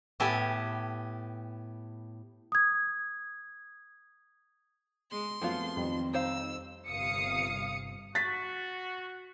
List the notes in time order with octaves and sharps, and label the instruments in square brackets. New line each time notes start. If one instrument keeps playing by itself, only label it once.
[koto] A2 B3 G4 A4 G#5
[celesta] D#6 G#6
[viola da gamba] G#3 [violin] C6
[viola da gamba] F#2 A3 C4 [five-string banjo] F3 B3 F4
[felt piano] F2 G3 [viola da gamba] D#3 C4
[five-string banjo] D#4 C5 F5 [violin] E6
[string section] G1 C3 F5 D#6 C#7
[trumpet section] F#4 [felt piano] A6 B6